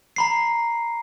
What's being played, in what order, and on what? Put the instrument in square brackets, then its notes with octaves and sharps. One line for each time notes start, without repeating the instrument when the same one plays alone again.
[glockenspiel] A#5 B5 C7